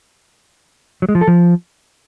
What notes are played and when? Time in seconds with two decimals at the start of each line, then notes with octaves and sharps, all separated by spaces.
1.02 F#3
1.09 G#3
1.15 F3
1.21 A4
1.28 F3